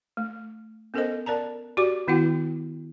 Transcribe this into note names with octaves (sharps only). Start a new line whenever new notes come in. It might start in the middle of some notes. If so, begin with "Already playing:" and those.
A3
B3 C#4 A4 A#4 C5 D#5
A#4 D5 A5 A#5
F#4 G4 D5 C#6 D6
D#3 B3 E4 F#4 F#5 G5